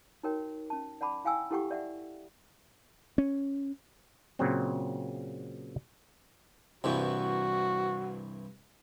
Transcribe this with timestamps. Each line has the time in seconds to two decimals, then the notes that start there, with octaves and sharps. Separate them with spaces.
0.23 D#4 F#4 A#4 C#5 G5
0.70 C#4 A5
1.01 D5 F#5 A5 B5 D6
1.24 E4 F5 G5 G#5 E6
1.51 E4 G4 A4 F#5 G5 C#6
1.71 D5 E5 F#5
3.18 C#4
4.39 A#2 C#3 F#3 C4
6.84 C2 G2 E3 F#4